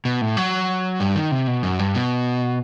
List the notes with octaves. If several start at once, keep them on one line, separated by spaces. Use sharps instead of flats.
B2
A2
F#3
G2
D#3
C3
B2
F#2
G2
B2